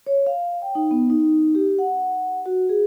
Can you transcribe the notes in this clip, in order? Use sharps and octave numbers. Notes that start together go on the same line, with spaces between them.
C#5
F5
G5
D#4
B3
D#4
G4
F#5
F#4
G#4